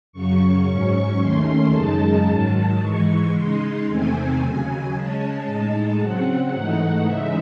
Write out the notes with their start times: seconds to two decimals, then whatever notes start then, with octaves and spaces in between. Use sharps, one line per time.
0.12 F#2 C#3 F#3 C#6
0.66 G#2 F#3 C#4
1.19 D#2 D#3 A3 C#4 C6
1.73 F#2 C#3 G#3 D#4 A5
2.27 G#2 D#3 F#3
2.79 G#2 E3 G#3 C#6
3.32 C#3 G#3 D#4 C6
3.87 E2 C3 D#3 A3 C4 G#5
4.40 D#2 C#3 F#3
4.93 C#3 G#3 C#4 A5
5.45 A2 G#3 D#4 A5
5.99 C#3 F#3 C4 F#5
6.52 G#2 E3 A3 D#4 F#5
7.06 C#3 E3 G#3 D#4 E5